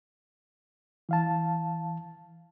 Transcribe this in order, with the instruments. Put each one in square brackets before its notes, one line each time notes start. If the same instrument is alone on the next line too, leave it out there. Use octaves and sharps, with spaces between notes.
[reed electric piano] E3 F5 A5